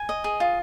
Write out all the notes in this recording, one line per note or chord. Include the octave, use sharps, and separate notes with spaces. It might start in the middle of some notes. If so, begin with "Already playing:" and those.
Already playing: G#5
D#5
G#4
F4